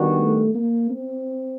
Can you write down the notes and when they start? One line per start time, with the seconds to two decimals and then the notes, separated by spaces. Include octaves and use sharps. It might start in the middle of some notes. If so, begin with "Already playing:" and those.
Already playing: D#3 G3 B3 D4 F#4
0.19 A3
0.55 A#3
0.90 C4